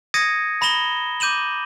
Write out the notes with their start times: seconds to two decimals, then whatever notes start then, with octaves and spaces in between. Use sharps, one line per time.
0.14 D#6 G#6 A#6 C#7 D#7
0.61 A#5 B5 A#6 E7 G7
1.20 D6 G6 D#7 E7 F#7